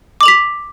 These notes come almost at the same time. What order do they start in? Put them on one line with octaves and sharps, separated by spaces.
D6 F#7 F7 B6